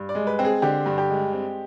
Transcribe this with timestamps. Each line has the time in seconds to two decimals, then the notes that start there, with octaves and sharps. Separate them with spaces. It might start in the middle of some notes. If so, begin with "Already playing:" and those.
Already playing: G2
0.09 D5
0.15 G#3
0.27 B4
0.39 C4
0.44 G#4
0.62 D3 G4
0.86 G2
0.98 G4
1.10 G#3
1.33 C4